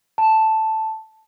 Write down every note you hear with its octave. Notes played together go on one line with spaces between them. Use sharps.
A5